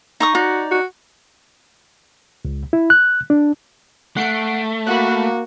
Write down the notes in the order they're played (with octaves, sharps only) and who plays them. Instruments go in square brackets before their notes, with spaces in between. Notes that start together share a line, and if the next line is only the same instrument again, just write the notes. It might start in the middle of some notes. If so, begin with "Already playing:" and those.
[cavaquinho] D#4 C#6 D#6
[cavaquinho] D#4 D5 [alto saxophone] F#4
[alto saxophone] F#4
[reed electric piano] C#2
E4
F#6
D4
[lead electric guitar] A3 [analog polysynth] F#5 C7 D7
[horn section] A#3 [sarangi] F#4 [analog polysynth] B5 F#6